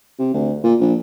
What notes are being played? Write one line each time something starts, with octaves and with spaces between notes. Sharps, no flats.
C3
D2
A#2
A#1